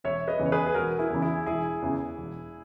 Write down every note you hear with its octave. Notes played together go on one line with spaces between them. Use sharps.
E1 C#5 E5
B4 D#5
E2 C#3 E3
C#5
G#4 B4
G#4
E1 F#4 A#4
E4 G#4
E2 C#3 E3
E4 G#4
E1 E4 G#4
E2 C#3 E3
E1